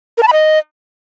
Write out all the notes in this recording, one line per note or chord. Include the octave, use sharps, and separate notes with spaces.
A#4
A5
B5
D#5